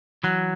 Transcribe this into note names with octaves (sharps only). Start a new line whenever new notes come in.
E3 F#3